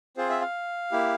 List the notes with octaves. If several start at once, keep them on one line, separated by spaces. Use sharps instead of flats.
C4 F4 G#4 C5
E5
F5
A#3 E4 G4